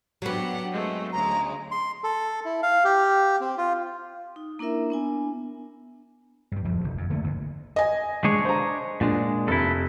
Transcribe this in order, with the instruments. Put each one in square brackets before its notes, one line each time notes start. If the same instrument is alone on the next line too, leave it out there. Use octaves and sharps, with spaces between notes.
[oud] F#3 B3 [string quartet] D4 G4 F#5
[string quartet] G#3 A3 C4
[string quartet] D2 C#3 G#3 [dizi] A#5
[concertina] C6
A4
E4
F5
G4
C4
F4
[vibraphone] D#4
A#3 D4 E4 A#4 E5
B3 D4 G#5
[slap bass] G2 G3
D1 F2 F3
F1
F2
D3 A3 A#3
G1 D2
[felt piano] D#5 G#5
[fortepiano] G#3 [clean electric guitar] D4 G#4 C#5
[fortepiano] C5 A#5
[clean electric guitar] A#2 G#3 [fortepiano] D4
[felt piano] F1 [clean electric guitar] E4 A4